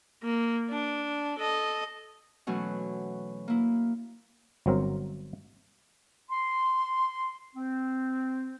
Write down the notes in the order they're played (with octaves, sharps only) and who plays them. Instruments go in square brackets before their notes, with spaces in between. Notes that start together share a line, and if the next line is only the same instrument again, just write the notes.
[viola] A#3
D4
A4 D#5
[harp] B2 E3 F#3 A3 C#4
A#3 E4
[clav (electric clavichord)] G1 F#3 C4 A#4
[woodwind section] C6
C4